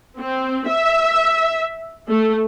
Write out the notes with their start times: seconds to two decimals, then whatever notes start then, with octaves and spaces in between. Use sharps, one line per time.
0.18 C4
0.68 E5
2.09 A3